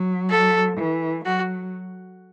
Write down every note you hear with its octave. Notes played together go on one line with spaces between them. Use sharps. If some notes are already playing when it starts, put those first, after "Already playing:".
Already playing: F#3
A4
E3
F#3 F#4